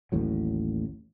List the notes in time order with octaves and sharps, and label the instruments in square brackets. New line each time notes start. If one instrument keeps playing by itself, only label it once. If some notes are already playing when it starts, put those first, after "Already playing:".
[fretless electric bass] A1 D#2 A2 F#3